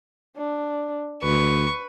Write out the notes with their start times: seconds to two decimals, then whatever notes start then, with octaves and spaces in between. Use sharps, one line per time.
0.37 D4
1.23 D2 B4 C#6